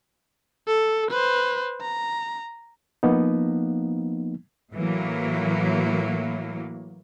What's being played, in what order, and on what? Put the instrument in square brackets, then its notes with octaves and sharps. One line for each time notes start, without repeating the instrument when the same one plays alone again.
[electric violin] A4
B4 C5
A#5
[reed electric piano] F3 A#3 B3 D#4
[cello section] A2 E3 F#3 A#3